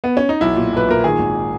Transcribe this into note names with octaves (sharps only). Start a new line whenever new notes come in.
B3
C#4
D#4
B1 E4
A#2
B1 B4
A#2 A#4
D#3 G#4
G#1